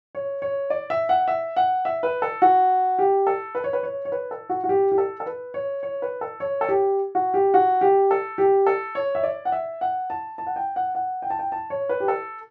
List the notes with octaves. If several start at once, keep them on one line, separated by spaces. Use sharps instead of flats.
C#5
C#5
D5
E5
F#5
E5
F#5
E5
B4
A4
F#4
G4
A4
B4
C#5
B4
C#5
C#5
B4
A4
F#4
F#4
G4
G4
A4
A4
B4
C#5
C#5
B4
A4
C#5
A4
G4
F#4
G4
F#4
G4
A4
G4
A4
C#5
E5
D5
F#5
E5
F#5
A5
A5
F#5
G5
F#5
F#5
G5
A5
G5
A5
C#5
B4
G4
A4